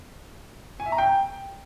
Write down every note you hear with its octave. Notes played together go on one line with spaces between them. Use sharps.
G#5
E5
A#5
G5